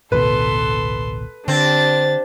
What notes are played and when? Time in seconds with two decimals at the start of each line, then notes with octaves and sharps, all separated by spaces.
0.12 A1 D2 B2 A4 B4 C6
1.48 D3 C4 D4 G4 A6